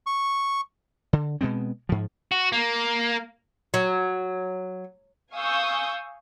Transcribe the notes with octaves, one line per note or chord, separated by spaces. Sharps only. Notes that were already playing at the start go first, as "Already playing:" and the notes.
C#6
D3
B2 G#3 B3 C4
G#2 F3
F#4
A#3
F#3
F5 G#5 C#6 D#6 E6 G6